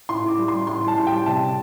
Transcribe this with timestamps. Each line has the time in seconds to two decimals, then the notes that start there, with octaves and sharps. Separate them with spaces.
0.09 A2 C6
0.24 A2 D6
0.38 G3
0.48 C6
0.53 G3
0.67 A2 C6
0.82 G3
0.88 A5
0.97 A2
1.07 G5
1.12 G3
1.26 C3 A5
1.41 C3